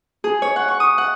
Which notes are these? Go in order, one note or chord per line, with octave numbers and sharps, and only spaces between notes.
G#4
C#5
F#5
C#6
D#6
F#5